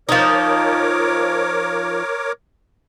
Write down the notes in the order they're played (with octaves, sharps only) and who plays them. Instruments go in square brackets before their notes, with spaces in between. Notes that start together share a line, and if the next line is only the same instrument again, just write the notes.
[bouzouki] F3 D#4 [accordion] A#4 C#5 D6